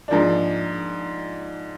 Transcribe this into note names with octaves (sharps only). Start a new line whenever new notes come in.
G#2 F3 A#3 D4